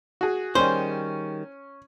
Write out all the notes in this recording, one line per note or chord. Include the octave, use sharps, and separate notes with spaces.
F#4 G#4
D#3 G3 C#4 G#4 C5